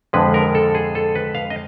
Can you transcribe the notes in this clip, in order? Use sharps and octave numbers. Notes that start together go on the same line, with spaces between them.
F2 D3 F3 G#3 B4
A#4
A4
G#4
A4
B4
F5
D#5